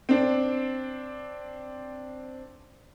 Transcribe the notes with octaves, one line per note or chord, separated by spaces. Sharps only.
C4 D4